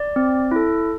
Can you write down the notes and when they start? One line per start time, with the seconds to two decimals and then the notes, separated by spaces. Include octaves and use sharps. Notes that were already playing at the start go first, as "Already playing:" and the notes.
Already playing: D5
0.16 C4
0.51 E4 A4